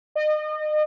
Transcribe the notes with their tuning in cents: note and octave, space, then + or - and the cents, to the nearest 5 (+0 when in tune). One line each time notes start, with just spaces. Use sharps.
D#5 -35